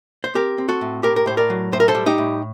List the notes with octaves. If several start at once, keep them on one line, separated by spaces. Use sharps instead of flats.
C5
C4 G4 A#4
C4
F#4 A4
A2
A2 G4 A#4
A#4
A2 C5
A#4 D5
F#3
A2 C5
A#4
A4 C5
G3
D#4 G4
A2